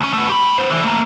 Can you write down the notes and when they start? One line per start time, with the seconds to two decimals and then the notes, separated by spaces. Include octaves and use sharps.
0.01 D2 C#4
0.14 A3 B3
0.29 G4 B5
0.57 B3 C5
0.70 D3 E3
0.84 A3 A#3